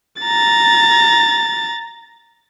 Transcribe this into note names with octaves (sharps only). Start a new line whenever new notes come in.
A#5 A6